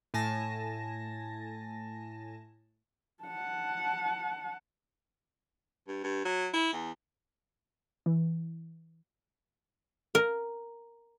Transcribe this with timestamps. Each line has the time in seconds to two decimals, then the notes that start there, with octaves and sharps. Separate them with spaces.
0.14 A2 G#5 A5 A#6
3.23 F#5 A5
5.88 G2
6.04 G2
6.25 F#3
6.54 E4
6.73 E2
8.06 E3
10.15 A#4